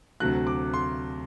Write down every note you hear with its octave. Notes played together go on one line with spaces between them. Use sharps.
D2 C3 F#3 A3 F#6
D6
C6